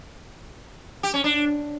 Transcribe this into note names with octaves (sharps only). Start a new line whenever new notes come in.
G4
C#4
D4